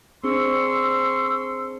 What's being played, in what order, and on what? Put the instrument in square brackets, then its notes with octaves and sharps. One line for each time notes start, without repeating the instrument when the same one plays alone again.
[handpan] C4 D4 G#4 [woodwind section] C6 C#6 E6